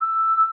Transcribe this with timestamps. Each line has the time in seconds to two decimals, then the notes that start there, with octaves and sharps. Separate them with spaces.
0.01 E6